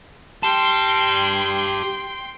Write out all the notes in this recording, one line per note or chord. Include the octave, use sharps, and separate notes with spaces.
G4 G5 A5 C6